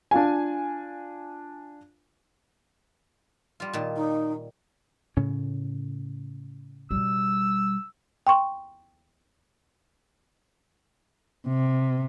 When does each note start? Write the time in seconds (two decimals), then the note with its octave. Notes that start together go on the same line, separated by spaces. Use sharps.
0.11 D4 F4 F5 G#5
3.60 G3 F4
3.73 A#2 D#3
3.96 D#4
5.17 A2 C#3 C#4
6.91 B2 G3 E6
8.27 G5 C6 C#6
11.47 C3